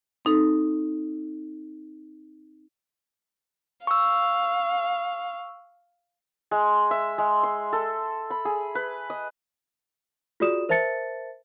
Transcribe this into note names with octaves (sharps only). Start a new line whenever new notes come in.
C4 D#4 A4
F5 C#6 E6
G#3
E5
G#3
C6
A4
B5
G#4
B4
D#5
F4 F#4 G#4 D5 D#6 E7
A#4 C5 E5 A5 A6 C#7